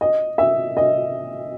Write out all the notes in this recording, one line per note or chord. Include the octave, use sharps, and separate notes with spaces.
D#5
E5
D#5